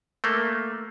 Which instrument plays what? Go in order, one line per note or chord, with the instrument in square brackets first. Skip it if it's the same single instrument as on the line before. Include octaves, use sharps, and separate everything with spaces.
[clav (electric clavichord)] A3 A#3